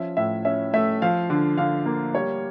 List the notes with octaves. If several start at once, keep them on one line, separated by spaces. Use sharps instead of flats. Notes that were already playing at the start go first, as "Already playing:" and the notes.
Already playing: F3 C#4 E5
A2 E5
C#4 E5
A3 E5
F3 F5
D3
D3 F5
A#3
G3 C#5